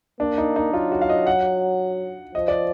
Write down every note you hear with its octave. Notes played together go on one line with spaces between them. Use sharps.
A#3 D4
D#4
D#4
F#3 F4
F#4
F5
D#5
F#5
F3 D#5
D5